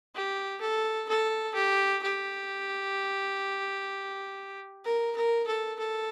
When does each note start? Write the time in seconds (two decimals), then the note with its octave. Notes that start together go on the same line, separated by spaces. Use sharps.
0.15 G4
0.61 A4
1.09 A4
1.55 G4
2.03 G4
4.85 A#4
5.16 A#4
5.47 A4
5.79 A4